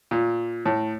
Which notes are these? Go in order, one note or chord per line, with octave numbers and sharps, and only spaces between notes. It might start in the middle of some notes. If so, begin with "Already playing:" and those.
A#2
A2